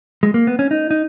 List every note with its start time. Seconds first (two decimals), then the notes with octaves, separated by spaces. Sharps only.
0.23 G#3
0.34 A#3
0.47 B3
0.59 C#4
0.71 D#4
0.91 D#4